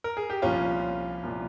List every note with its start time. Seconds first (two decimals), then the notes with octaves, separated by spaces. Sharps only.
0.04 A#4
0.17 G#4
0.30 G4
0.42 C2 A#2 F3 C#4 F4
1.23 C2 A#2 F3